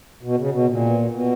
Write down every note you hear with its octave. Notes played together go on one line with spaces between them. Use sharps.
B2
C#3
B2
A#2
B2